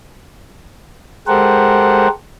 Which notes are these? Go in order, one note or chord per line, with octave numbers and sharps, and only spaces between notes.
G#3 G4 A4 A#4 C5 F#5